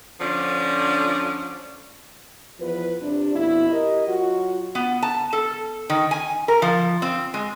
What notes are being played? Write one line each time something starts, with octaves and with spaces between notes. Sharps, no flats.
D3 F3 C#4 D4
E2 F3 B4
C3 G3 D4
F2 B2 E4
G4 A#4 D#5
F#3 F4 F#4
B3
A5
A4
D#3
G#5
A#4
F3
C4
G#3